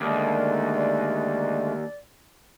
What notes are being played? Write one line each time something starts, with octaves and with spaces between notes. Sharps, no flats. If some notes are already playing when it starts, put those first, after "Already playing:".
D#2 D3 G#3 A3 D5